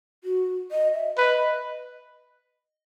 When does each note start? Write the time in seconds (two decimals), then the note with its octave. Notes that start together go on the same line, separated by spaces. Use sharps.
0.24 F#4
0.72 D#5
0.94 E5
1.18 B4 D#5